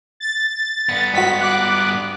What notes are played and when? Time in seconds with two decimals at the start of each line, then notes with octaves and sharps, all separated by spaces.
0.20 A6
0.89 G2 B3
1.14 G#1 F#4 B6
1.40 D6 F#6